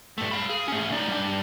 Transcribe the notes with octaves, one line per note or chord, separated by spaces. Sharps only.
G2 A3
F5 B5
G#4
A3 C#4
D#4 D5
G3 D4